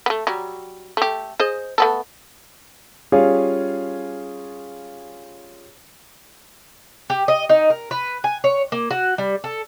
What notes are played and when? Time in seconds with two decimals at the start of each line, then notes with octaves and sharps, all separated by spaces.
0.06 A3 B3
0.27 F#3 G3
0.97 A3 G4
1.40 G#4 C5 D#5
1.78 A3 B3 A4
3.12 G3 C#4 F4 G#4 C#5 F5
7.10 G4
7.28 D#5
7.49 D#4
7.70 A#4
7.91 B4
8.24 G#5
8.44 C#5
8.72 A#3
8.91 F#4
9.18 G3
9.44 A4